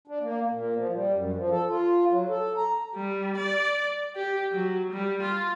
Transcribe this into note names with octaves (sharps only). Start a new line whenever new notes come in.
D4
A#3
A#2
F3
G3
F#2
F3
A4
F4
F#3
A4
A#5
G3
D5
G4
F#3
G3
F4